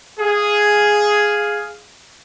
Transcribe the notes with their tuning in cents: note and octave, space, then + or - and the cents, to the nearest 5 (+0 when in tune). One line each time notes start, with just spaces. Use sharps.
G#4 +0 F5 +0